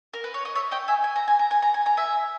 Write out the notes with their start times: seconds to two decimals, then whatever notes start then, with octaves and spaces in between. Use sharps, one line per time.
0.13 A#4
0.24 B4
0.34 C#5
0.45 D#5
0.55 C#5 E5
0.71 D#5 G5
0.88 E5 G#5
1.04 G#5
1.16 A#5
1.28 G#5
1.39 A#5
1.51 G#5
1.62 A#5
1.74 G#5
1.86 A#5
1.97 E5 G#5